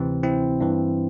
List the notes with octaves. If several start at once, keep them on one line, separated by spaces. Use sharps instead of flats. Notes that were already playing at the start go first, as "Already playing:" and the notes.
Already playing: D2 C3 E3 C4
C4 E4
G2 E3